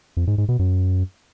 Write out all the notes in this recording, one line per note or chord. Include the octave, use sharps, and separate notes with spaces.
F2
G#2
G#2
B2
F#2